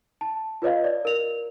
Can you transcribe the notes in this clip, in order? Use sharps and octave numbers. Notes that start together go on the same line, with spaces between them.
A5
F4 B4 C#5 D#5 F5
D5
A#4 F7